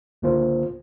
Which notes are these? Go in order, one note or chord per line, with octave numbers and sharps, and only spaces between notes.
C#2 D3 A#3 F4 C5